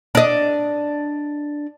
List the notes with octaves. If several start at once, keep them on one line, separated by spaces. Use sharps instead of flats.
D4 D#5